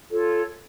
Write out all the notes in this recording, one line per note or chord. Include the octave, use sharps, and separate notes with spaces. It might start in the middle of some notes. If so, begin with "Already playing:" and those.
F4 A4 C#5